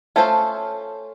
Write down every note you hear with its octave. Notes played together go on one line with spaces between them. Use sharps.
A3 C#4 F4 A4 C5